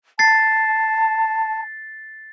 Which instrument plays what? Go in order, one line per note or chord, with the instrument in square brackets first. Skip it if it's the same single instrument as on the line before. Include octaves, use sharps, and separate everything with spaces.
[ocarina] A5 [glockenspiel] A6 C7